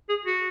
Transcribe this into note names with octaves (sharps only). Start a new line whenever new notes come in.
G#4
F#4